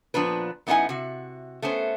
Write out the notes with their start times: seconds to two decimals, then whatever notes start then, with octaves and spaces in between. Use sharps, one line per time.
0.14 A#2 F3 B3 D4 B4
0.67 F#2 B3 D#4 E4 F#5 G#5
0.89 C3 F#4
1.62 A3 B3 C#4 C5